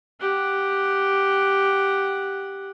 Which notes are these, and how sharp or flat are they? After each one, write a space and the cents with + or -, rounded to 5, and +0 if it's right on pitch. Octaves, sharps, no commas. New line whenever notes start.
G4 +0 F#5 +0